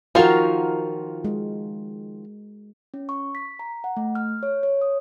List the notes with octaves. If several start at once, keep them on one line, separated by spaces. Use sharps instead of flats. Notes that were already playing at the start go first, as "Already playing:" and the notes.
D#3 F3 F4 F#4 A#4
G#3
C#4
C#6
B6
A#5
F#5
A3
F6
C#5
C#5
D#6